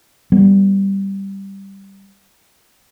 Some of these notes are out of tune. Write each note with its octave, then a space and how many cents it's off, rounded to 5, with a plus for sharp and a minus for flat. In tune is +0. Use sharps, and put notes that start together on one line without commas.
G3 +0 B3 -15